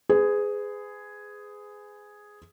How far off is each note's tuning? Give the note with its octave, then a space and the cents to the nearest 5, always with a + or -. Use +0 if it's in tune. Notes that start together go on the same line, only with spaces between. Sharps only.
G#4 +0 B4 +40